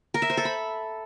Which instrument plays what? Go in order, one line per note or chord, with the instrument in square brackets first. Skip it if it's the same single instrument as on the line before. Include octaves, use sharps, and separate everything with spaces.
[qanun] A#4
E5
C5
A4
B5